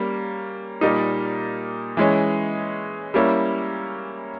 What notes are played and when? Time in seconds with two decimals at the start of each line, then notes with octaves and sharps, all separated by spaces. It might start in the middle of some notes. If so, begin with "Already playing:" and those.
Already playing: G3 A#3 C#4
0.81 A#2 G3 A#3 D#4
1.97 E3 G#3 C#4
3.14 G3 A#3 C#4 E4